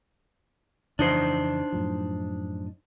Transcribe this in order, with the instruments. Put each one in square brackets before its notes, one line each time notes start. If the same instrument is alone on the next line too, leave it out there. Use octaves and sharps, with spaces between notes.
[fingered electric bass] F2 C#3 E3 [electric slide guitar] D4 D#4 C5
[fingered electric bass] F#2 A2 F3